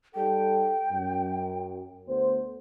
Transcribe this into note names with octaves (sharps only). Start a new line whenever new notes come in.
G3 D#4 A4 G5
F#2
D2 B3 C5